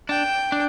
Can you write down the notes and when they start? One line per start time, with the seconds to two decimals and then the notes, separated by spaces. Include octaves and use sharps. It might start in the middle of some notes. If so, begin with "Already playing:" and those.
0.09 D4 G5
0.52 D4